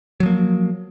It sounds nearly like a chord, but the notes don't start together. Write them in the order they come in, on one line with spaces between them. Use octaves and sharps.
F#3 F3 A#3